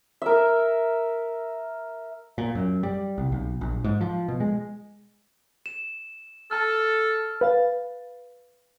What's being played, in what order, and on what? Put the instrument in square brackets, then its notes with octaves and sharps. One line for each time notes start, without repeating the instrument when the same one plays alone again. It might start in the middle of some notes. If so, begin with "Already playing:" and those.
[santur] A#4 E5
[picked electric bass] A#2
F#2
G3
C2
B1
A#1
G#2
F3
B2
G#3
[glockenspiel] E7
[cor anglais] A4 [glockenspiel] A5 F6
[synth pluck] B4 F5 A6